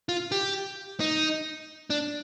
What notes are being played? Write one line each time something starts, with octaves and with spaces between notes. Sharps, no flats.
F4
G4
D#4
D4